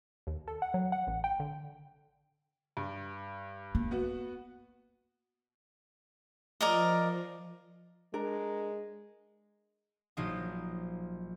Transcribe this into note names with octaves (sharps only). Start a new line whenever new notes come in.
D#2
A4
F#5
F#3
F#5
A1
G5
D3
G2
A#3
B3 F#4
F3 A#4 D5 D#5
G#3 D4 A#4
A#1 F3 F#3 D#4 F4 D#6